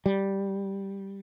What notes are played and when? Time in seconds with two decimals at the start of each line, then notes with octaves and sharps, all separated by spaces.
0.06 G3